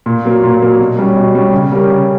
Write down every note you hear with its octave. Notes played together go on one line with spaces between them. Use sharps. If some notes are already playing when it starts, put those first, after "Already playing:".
A#2
F#3 A#3
A#2
F#3 A#3
B2
G3 C#4
B2
G3 C#4
C#3
G3 C#4 G4 A#4
C#3